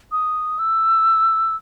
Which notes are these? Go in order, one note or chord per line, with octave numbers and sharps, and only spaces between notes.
D#6
E6